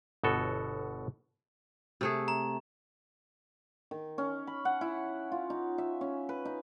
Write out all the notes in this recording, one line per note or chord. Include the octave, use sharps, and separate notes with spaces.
G1 B2 F#4 A4 G#5
C3 A3 G#4
A#5
D#3
C#4
B5
F#5
E4
F4
D#4
E5
C#4
B4
D#4